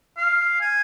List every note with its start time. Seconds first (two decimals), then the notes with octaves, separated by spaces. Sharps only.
0.17 F5
0.61 G#5